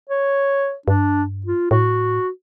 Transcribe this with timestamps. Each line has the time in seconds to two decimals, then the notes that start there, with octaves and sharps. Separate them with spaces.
0.10 C#5
0.88 G2 D4
1.47 F4
1.71 A2 F#4